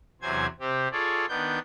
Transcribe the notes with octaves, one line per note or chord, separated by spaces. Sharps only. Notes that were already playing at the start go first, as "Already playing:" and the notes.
E2 C3 F#3 C5 G#5 G#6
C3 C4 G4
F4 G#4 A4 C#5 D5
D#3 B3 D4 G6